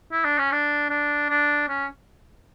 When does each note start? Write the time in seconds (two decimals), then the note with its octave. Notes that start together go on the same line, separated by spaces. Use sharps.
0.12 E4
0.25 D4
0.39 C#4
0.52 D4
0.90 D4
1.30 D4
1.68 C#4